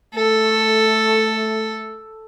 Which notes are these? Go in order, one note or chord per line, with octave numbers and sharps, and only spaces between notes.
A3 A4